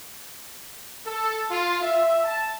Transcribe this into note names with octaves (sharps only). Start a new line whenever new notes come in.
A4
F4
E5
A5